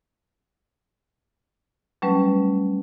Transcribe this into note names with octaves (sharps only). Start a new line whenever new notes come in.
F#3 G3 A3 C#4 B4